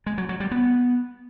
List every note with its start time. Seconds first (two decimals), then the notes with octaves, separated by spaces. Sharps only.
0.06 G#3
0.18 F#3
0.29 F#3
0.40 G3
0.51 B3